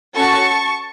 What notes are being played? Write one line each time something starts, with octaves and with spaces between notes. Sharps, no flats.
C#4 F#4 A4 A5 C#6